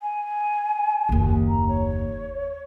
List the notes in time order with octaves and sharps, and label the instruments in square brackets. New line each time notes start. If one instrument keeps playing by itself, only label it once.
[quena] G#5
[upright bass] F#1 D#2
[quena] A#5
C#5